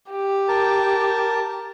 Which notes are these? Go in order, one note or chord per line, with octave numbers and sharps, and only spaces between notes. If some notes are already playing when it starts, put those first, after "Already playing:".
G4
A#4 A5